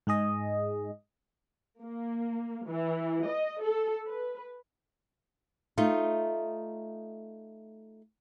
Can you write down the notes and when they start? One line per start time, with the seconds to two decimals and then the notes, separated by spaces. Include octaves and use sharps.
0.07 G#2 G#3 G#4 D#5
1.82 A#3
2.66 E3
3.26 D#5
3.62 A4
4.07 B4
5.78 A3 D#4 F4